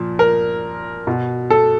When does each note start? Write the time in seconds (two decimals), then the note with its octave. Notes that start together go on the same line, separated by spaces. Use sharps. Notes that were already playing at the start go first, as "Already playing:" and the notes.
Already playing: A#2 F3
0.19 A#4
1.07 B2
1.50 A4